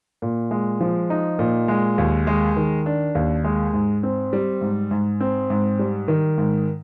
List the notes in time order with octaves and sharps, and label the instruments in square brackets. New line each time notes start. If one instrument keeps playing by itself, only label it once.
[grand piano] A#2
G#3
F3
D#4
A#2
G#3
D#2
G#3
D#3
D4
D#2
G#3
G#2
C4
G3
G#2
G#2
C4
G#2
G3
D#3
G#2